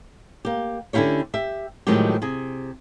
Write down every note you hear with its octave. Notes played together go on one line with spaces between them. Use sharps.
A#3 G4
D3 C#4 E4 F4 G4 C#5
G4 E5
A2 D#3 F3 F#3 G#3 G4
C3 G#4